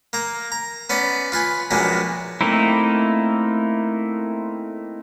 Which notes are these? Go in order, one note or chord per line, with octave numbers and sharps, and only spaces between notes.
A#3 A#5
A#5
B3 C#4 D5
F4 B4 G#5
A#1 F#2 G#3 A#3 B3 D4
A3 A#3 C4 D#4 E4